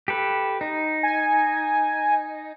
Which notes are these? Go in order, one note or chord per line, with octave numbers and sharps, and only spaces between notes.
G4 A4 B4
D#4
G#5